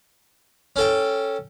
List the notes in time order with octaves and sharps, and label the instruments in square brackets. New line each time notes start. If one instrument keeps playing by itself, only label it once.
[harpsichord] C#4 A4 G5